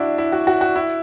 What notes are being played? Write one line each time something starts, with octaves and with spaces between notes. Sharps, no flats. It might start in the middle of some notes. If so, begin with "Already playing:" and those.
Already playing: D4 E4 F#4
E4
F#4
F#4
F#4
E4